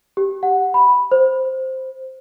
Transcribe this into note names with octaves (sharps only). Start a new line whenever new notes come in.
G4
F#5
B5
C5